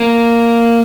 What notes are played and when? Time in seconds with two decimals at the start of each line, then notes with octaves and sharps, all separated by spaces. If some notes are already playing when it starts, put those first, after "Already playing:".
Already playing: A#3